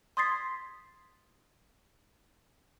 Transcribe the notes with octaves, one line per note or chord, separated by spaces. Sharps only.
C6 D#6 G#6 A6 B6 C7